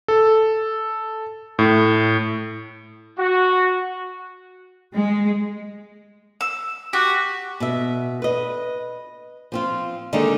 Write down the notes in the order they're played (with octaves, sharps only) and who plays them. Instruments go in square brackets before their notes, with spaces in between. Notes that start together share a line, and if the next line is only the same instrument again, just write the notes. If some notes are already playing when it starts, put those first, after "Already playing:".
[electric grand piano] A4
A2
[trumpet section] F#4
[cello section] G#3
[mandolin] E6
[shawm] F#4 [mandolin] G4
[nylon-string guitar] B2 E5
B4 D#5
F3 C4 F4
D3 D#3 G3 G#3 A#3 D#4